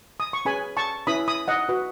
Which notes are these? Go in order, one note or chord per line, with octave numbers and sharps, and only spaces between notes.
D#6
C#6
C#4 G#4 B4 G#5 B5
A5 C#6
C#4 E4 B4 B5 D#6
B5 D#6
D#5 F#5
F#4 B4